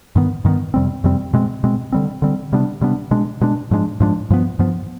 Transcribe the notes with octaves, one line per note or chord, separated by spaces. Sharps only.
G2 D#3 B3
G2 D#3 B3
F2 C3 G3 C4
F2 C3 G3 C4
B2 G#3 C4
B2 G#3 C4
D3 G3 C4
D3 G3 C4
C3 G3 B3 D4
C3 G3 B3 D4
B2 G#3 D4
B2 G#3 D4
G#2 F3 G#3 D4
G#2 F3 G#3 D4
G2 F3 B3
G2 F3 B3